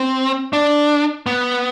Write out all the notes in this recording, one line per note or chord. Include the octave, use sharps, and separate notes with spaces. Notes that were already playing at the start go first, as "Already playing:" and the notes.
Already playing: C4
D4
B3